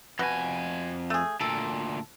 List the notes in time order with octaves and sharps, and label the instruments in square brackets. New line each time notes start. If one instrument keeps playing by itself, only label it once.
[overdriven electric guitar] F2 G#5 [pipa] B2
[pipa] A3 G#4
[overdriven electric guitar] D2 A#2 [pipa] A4